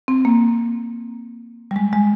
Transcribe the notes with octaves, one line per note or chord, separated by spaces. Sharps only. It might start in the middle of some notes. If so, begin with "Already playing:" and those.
C4
A#3
G3
G#3
G#3